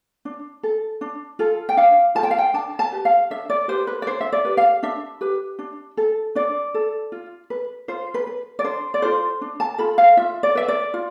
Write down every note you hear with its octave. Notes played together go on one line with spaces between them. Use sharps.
D4
A4
D4
F4 A4
G5
D4 F5
F4 A4 A5
G5
F5
G5
D4 A5
A5
G4 B4
F5
D4 E5
D5
G4 B4 C5
B4
D5
D4 C5
E5
D5
G4 B4
F5
D4 E5
G4 B4
D4
A4
D4 D5
A4
F4
B4
F4 C5
B4
B4
D5
D4 C5
D5
F4 A4 C5
D4
A5
F4 A4 B5
F5
F4 E5
D5
B4 E5
D5
F4